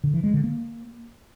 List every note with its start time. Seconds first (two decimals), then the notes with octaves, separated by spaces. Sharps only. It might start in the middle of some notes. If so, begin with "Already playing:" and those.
0.04 D3
0.14 E3
0.24 G#3
0.34 D3
0.44 A#3